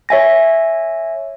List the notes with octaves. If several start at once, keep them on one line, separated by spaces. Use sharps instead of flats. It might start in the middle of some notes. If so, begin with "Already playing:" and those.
C#5 E5 G#5 A#6